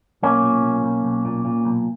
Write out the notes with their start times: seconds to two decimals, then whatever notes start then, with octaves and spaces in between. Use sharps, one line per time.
0.23 B1 A#3 C#4
0.43 A#2
0.63 B1
0.84 B1
1.05 B1
1.25 A#2
1.45 A#2
1.65 B1